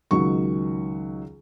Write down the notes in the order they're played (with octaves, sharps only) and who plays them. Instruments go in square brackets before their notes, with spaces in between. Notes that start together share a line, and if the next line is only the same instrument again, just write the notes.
[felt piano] C#2 D#3 F#3 C#6